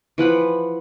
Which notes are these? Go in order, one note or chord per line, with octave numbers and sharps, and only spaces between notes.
E3 F3 F#5 B5